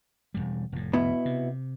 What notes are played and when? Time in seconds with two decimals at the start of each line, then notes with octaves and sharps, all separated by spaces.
0.34 E1 C#2 G3
0.72 F1 A2
0.93 B2 B3 E4
1.25 C3